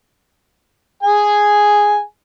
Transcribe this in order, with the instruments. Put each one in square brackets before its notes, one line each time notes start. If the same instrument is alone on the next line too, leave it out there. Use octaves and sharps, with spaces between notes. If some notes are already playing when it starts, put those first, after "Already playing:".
[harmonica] G#4 G#5